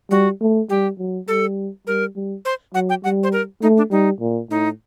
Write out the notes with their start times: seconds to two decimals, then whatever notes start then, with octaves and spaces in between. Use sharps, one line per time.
0.10 G3 F#4
0.41 A3
0.69 G3 G4
0.99 F#3
1.28 G3 A4
1.87 G3 A#4
2.15 G3
2.45 C5
2.74 F#3 F#5
2.90 G5
3.04 G3 F#5
3.23 C5
3.33 A#4
3.62 A3 D#4
3.77 D4
3.91 G3 D#4
4.20 A#2
4.50 A2 D#4